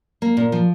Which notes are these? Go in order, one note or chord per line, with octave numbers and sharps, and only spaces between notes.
A#3
A#2
F3